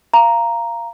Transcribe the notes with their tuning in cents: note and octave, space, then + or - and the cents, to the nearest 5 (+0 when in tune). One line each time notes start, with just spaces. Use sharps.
F5 -20 A#5 +0